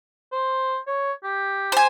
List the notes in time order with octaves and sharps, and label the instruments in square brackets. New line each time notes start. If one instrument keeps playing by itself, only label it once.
[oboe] C5
C#5
G4
[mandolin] C5 G#5